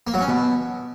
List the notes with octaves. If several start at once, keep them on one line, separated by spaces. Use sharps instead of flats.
A#3
F#3
C#4
B2